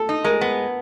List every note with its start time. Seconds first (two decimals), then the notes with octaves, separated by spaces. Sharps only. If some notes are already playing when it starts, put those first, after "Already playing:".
Already playing: A4
0.09 D#4
0.25 G#3 A#4
0.41 B3